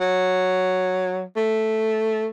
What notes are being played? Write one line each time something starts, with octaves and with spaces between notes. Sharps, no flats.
F#3
A3